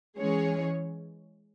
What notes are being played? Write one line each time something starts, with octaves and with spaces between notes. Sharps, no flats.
E3 G#3 C#4 G#4 C#5